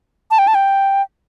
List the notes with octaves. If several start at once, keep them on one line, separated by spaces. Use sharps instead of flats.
A5
G5
A5
G5